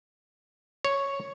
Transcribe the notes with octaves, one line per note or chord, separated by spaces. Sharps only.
C#5